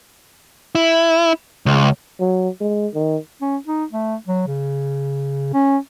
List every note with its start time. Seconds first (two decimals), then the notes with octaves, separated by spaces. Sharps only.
0.75 E4
1.66 C#2
2.20 F#3
2.61 G#3
2.94 D#3
3.41 C#4
3.67 D#4
3.92 A3
4.28 F#3
4.47 C#3
5.53 C#4